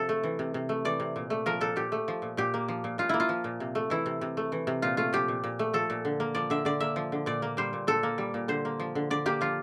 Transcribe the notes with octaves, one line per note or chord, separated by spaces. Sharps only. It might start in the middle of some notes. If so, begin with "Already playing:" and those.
Already playing: C3 F3 A4
A3
E3
C3
C3
A3
E3 D5
C3
A#2
A3
F3 A#4
A#2 A4
A#2 G4
A3
F3
A#2
A#2 G4
A#3
F3
A#2
A#2 F4
A#3 E4
F4
F3
A#2
C3
A3
E3 E4
C3
C3
A3
E3
C3
A#2 F4
A3 F4
F3 G4
A#2
A#2
A3
F3 A4
A#2
D3
A#3
F3 D5
D3 E5
D3 D5
A#3 E5
F3
D3
A#2 D5
A#3
G3 C5
A#2
A#2 A4
A#3
G3
A#2
D3 C5
A#3
F3
D3
D3 D5
A#3 G4
F3 F4